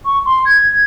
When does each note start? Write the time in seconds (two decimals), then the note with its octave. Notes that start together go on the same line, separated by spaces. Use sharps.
0.05 C#6
0.26 C6
0.46 G#6